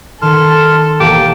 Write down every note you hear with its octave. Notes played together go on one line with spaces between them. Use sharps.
D#3 A4 A5 C6 F6
E1 A#3 G4 F5 A5 C#7